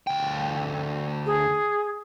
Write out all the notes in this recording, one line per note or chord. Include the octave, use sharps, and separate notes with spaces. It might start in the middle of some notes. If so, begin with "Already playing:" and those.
D2 G5
G#4